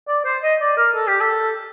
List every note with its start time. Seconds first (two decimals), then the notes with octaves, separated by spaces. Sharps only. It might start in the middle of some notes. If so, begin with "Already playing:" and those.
0.08 D5
0.25 C5
0.43 D#5
0.61 D5
0.77 A#4
0.95 A4
1.07 G4
1.21 A4